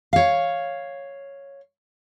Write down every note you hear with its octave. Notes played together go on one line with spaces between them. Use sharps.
C#5 F5